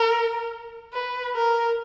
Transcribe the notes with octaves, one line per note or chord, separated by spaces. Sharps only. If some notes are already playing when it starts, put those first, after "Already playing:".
Already playing: A#4
B4
A#4